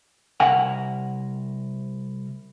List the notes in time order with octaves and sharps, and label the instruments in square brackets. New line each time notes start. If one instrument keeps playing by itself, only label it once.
[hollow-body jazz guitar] C2 C3 A#4 E5 F#5 G#5